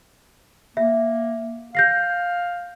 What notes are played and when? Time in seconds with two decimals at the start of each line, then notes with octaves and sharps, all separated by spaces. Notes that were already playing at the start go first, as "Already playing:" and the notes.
0.77 A#3 E5
1.75 F5 G6 A#6 C7